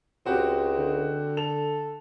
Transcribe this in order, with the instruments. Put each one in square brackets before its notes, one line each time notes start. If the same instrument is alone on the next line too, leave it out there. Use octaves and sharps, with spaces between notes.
[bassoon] C#2 [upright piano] C4 F#4 G4
[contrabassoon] D3
[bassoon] A4 [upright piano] F7